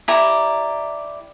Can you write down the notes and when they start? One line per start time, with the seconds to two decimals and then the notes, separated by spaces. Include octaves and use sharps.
0.08 E4 G4 D5 A#5